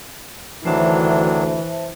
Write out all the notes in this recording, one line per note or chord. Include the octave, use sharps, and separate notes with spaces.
D2 D#3 E3 F#3 D4 C5 E5 A5